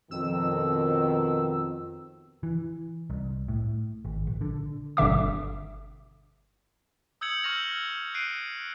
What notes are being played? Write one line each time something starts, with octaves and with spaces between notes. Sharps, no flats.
F2 B2 D#3 E6
E3
C2
A2
G#1
A#1
D3
G1 B2 D3 E5 D6
D#6 E6 G6 G#6 C#7 F#7
C#6 E6 F6 G6 A#6 F7
F#6 C7 D7 D#7